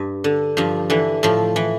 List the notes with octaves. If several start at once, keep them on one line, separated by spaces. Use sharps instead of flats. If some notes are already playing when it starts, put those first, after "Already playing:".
Already playing: G2
D3
G2 F3
D3 E3
A2 F3
E3